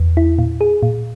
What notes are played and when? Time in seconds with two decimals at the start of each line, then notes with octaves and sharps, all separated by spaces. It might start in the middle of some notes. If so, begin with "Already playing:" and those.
Already playing: E2
0.17 E4
0.38 A#2
0.61 G#4
0.83 A#2